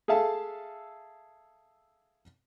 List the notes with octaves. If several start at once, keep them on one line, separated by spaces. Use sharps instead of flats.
G#4 A4 E5 F5 A5